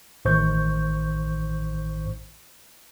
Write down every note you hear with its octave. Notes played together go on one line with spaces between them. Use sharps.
A1 D#3 C5 C#6 G6